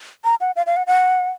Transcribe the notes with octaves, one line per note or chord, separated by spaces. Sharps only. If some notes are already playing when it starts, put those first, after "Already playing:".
A#5
F#5
F5
F5
F#5
F#5